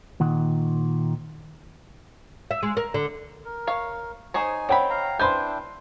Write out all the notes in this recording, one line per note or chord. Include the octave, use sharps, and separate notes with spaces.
A#2 D#3 F#5
E5
G#3
A#4
D3
A#4
C#5 F5
D#4 G#4 C5 C#5 G#5
D#3 C4 C#5 F#5 G5 B5
F5 A#5
D4 E4 B4 C5 G5 G#5 C6 G6